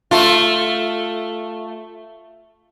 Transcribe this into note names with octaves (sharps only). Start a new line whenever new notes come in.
A3 F4